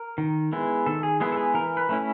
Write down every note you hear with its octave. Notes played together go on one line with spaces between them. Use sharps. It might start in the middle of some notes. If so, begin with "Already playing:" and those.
Already playing: A#4
D#3
G#3 B3 E4
D#3 A4
G#4
G#3 B3 E4 G#4
A4
G#4
E3 A#4
B4
A3 C#4 E4